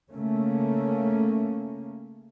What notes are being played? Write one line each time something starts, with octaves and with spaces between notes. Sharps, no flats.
C#3 A3 A#3 C#4